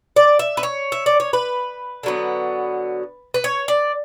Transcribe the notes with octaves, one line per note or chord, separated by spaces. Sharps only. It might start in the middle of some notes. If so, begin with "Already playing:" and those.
D5
E5
B4
C#5
E5
D5
C#5
B4
D3 F#3 B3
B4
C#5
D5